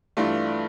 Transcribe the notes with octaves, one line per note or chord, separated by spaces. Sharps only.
G2 E3 A3 D4 F4